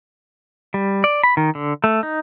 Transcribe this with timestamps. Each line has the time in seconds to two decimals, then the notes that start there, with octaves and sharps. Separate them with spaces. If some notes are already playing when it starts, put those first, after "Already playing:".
0.74 G3
1.04 D5
1.24 B5
1.37 D#3
1.55 D3
1.84 A3
2.03 D#4